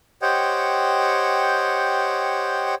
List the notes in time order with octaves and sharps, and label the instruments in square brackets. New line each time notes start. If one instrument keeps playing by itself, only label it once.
[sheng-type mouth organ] G4 C5 C#5 D#5 F#5 G5